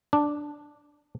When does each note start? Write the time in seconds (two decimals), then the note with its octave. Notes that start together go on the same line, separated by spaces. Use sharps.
0.13 D4